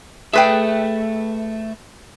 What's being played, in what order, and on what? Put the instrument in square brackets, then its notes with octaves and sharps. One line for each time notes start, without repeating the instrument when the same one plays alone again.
[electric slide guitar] A3 E5 [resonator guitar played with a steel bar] G#4 B4 G5